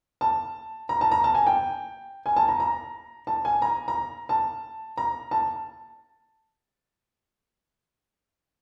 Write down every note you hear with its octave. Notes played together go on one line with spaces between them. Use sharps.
A5
A#5
A5
A#5
A5
G#5
G5
G#5
A5
A#5
A#5
A5
G#5
A#5
A#5
A5
A#5
A5